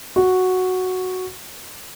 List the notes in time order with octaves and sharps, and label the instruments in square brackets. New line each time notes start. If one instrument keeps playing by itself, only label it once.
[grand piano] F#4